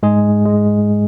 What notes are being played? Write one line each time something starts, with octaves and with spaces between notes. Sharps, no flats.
G#2 G#3 G#4
G#3